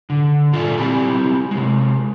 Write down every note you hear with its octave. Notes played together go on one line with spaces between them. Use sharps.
D3
A#2 F4 A4 D5 E5 G#5
C4 E4 G4 G#5
C3 G#3